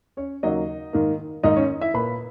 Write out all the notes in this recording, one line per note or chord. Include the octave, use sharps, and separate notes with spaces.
C#4 C#5
D#2 C#3 F#3 A#3 D#4 D#5
G#2 D#3 A#3
G#2 D#3 A#3 D#4 D#5
C#4 C#5
E4 E5
A#2 A#3 B4 B5